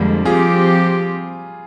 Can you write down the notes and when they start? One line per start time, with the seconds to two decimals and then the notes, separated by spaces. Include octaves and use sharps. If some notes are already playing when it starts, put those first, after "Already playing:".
Already playing: F2 D3 G3 G#3 A#3
0.25 F3 C4 F4 G4 G#4